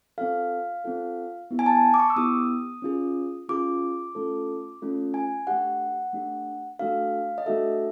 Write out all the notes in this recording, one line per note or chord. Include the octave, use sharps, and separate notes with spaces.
C4 F4 A4 F5
C4 F4 A4
B3 E4 G4
G#5
A5
D6
C#6
E6
B3 E4 G4 D#6
C#4 F4 G#4
C#4 F4 G#4 D6
A3 C#4 F4 A4
A3 C#4 F4 A4
G#5
A3 D4 G4 F#5
A3 D4 G4
A3 D4 F#4 A4 F5
D#5
A3 D4 F#4 A4 E5